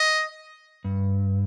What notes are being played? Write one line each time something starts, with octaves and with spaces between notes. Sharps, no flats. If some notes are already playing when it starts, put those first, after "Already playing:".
Already playing: D#5
G2